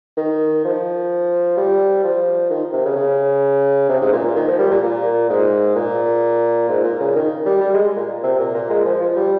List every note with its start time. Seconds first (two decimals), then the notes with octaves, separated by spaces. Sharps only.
0.17 D#3
0.65 F3
1.57 G3
2.04 F3
2.50 D#3
2.73 C3
2.85 C#3
2.96 C#3
3.89 C3
4.01 G#2
4.13 A#2
4.25 A#2
4.36 D#3
4.48 F3
4.59 G3
4.71 A#2
4.83 A#2
5.30 G#2
5.76 A#2
6.69 G#2
6.84 A#2
7.00 C#3
7.15 D#3
7.46 G3
7.61 G3
7.73 G#3
7.96 A#2
8.23 C3
8.39 A#2
8.54 A#2
8.70 G#3
8.85 F3
9.01 F3
9.17 G3